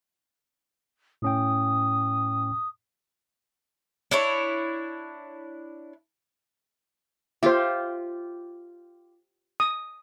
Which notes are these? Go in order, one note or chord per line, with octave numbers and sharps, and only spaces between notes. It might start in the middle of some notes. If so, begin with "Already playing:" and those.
A2 C#4 G5 D#6
D4 E4 C#5
F4 G4 C5 E5
D#6